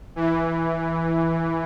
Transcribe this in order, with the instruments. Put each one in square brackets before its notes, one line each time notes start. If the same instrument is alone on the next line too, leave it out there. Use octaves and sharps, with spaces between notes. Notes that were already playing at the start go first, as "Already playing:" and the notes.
[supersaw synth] E3